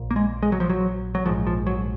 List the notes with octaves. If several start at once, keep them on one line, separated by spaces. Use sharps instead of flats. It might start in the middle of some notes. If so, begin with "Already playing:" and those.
Already playing: A#1 A#2
A#3
G#3
G#3
F#3
F3
F#3
F#3
A#1 G#2 F3
F3
F#3